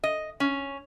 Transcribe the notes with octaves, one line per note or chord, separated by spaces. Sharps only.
D#5
C#4